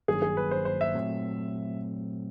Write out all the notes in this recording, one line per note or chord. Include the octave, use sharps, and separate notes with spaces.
G#1 G2 D#3 F#3 A#3 G#4
G#4
B4
C5
C5
E5
A#2 F#3 A3 C4